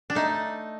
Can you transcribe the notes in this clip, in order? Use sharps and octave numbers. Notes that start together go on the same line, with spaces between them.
D4
A3 D#4